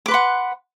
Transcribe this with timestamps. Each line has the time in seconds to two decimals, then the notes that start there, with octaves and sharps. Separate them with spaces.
0.06 D6
0.08 B4
0.11 C6
0.14 F#5